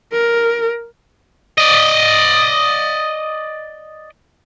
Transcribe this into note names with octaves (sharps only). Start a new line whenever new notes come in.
A#4
D5 D#5